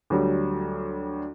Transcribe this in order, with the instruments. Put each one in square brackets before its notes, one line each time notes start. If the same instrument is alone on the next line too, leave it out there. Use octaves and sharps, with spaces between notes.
[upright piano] D2 F#3 G3